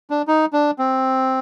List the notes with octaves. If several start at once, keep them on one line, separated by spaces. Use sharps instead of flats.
D4
D#4
D4
C4